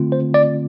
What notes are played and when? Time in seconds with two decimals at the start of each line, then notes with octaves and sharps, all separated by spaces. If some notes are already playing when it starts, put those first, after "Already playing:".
Already playing: D3 A3 C4 F4
0.12 C5
0.34 D5